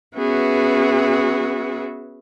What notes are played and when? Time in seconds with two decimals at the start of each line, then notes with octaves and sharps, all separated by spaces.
0.16 B3 C#4 F#4 G#4 B4 E5